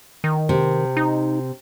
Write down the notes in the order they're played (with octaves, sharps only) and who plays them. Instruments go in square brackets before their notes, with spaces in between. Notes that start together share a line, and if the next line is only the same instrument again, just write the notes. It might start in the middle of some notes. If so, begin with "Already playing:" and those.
[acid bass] D#3
[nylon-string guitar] C3
[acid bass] D#4